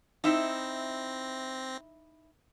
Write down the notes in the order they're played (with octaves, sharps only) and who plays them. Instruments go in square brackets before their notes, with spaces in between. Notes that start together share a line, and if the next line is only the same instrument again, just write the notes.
[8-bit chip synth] C4 A#6 [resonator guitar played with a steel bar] D#4 E4 E5